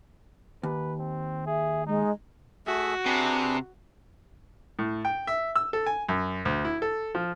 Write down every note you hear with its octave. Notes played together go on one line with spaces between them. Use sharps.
D#2 B4
C4
G#4 E5
G#3 D#4
A3 F#4 G#4 E5
C3 D4 G#4 B4
A2
G5
E5
E6
A4
G#5
F#2
D2
E4
A4
F3